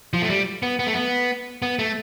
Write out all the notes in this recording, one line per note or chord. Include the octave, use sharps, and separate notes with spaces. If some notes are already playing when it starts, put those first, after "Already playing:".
F3
A3
G3
B3
B3
A3
B3
B3
A3